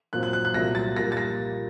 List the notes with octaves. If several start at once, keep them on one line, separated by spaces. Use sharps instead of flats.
A#2 F#3 C4 F#6
F#6
F#6
F#6
C2 A#2 F#3 A#6
A6
A#2 G3 A#3 A#6
A6
A#6